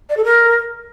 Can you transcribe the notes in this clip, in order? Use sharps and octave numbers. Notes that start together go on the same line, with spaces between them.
D5
A4
A#4